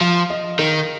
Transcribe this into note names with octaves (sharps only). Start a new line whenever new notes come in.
F3 F5
D#5
D#3 A#4